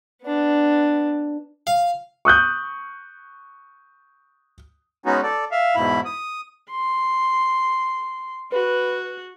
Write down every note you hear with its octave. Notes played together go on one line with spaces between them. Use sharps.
B3 D4
F5
C#6 D#6 F#6 G6
G#3 B3 C#4 D#4 F#4
A4 D5
E5 F5
E2 G#2 B2 E4 B5
D#6
C6
F#4 B4